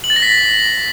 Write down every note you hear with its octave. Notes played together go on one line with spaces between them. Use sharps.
F#7
A6
A#6
B6